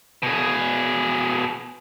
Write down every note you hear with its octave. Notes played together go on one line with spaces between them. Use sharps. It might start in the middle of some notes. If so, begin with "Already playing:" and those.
B2 G#4